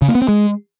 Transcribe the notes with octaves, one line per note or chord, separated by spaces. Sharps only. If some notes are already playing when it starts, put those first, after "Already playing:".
C#3
A#3
B3
C4
G#3